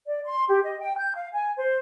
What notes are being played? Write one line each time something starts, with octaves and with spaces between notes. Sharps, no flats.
D5
C6
G4
D#5
G5
G6
F5
G#5
C5